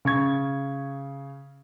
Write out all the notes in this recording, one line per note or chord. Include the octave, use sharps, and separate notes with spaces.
C#3 C#6 G#6